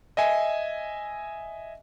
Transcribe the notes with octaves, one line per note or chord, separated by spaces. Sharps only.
D#5 E5 G#5